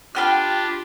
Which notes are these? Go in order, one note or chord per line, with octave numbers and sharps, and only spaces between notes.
D4 F4 G4 B4 G5 F6